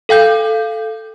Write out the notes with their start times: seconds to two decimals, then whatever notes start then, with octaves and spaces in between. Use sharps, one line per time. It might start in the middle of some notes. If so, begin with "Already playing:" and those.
0.09 A4 F5 G5 G6